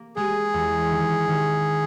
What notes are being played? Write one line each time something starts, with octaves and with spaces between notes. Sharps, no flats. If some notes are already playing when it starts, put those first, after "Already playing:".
Already playing: A#3
G#3 G#4
E2
D#3
D#3